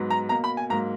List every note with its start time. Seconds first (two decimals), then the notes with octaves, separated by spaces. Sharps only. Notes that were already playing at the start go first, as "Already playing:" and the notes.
Already playing: G#2 F#3 B3
0.10 A#5
0.29 B2 A#3 A#5
0.44 B5
0.57 G#5
0.70 G#2 F#3 A#3 A#5